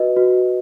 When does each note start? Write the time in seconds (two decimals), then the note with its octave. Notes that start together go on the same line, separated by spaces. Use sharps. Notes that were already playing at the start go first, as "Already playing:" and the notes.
Already playing: F#4 B4 D#5
0.17 F#4